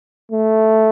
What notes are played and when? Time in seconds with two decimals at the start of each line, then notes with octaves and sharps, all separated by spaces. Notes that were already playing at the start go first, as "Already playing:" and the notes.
0.32 A3